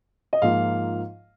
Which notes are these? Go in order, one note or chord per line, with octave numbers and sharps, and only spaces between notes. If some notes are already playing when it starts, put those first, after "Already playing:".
D#5
G#2 F3 A#3 F4 F5